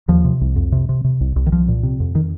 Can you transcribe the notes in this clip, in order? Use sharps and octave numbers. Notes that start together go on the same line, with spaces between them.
D#2 F3
C3
C2
F2
C3
C3
C3
C2
C2
D#3
C2 F3
A#2
C3
F2
D#3